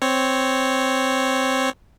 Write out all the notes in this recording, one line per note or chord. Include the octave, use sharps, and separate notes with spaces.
C4 C#5